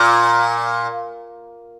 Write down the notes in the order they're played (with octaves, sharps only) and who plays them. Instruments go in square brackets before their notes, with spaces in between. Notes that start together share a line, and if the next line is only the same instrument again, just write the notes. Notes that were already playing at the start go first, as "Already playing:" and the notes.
Already playing: [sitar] A#2